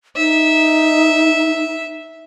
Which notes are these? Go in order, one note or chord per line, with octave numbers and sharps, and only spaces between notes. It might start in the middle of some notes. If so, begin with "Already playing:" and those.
D#4 E5